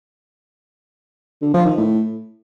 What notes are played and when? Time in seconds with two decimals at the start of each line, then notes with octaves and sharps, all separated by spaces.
1.42 D3
1.54 F3
1.65 D#3
1.77 A2